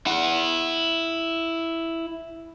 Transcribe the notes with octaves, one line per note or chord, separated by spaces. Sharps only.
E4 F#5